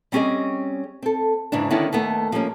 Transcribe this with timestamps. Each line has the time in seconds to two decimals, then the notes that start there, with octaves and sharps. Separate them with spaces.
0.12 G3 C4 C#4 G4 G#4 D#5
1.02 C4 A4
1.52 E2 G#2 C#3 E3 D4
1.70 D3 D#3 B3 C#4 D4 E4
1.93 D#2 A3 B3
2.32 F3 G3 G#3 A#3 C#4